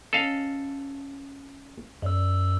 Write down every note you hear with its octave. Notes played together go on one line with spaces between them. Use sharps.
C#4 A4 D#5 F5
F#2 D5 E6